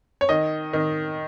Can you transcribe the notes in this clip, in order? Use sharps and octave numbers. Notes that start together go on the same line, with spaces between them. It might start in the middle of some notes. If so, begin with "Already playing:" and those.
C#5
D#3 D#5
D#3